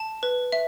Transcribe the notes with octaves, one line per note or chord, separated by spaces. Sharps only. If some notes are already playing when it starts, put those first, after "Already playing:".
Already playing: A5
B4
E5